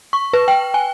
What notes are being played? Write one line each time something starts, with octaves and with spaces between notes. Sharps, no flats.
C#6
B4
G5
G#5